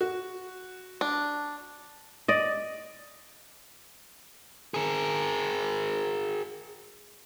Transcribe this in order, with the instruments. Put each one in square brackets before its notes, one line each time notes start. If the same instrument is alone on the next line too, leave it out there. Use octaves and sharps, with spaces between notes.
[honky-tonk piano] F#4
[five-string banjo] D4
[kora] D5 D#5
[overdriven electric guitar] G#4 A#4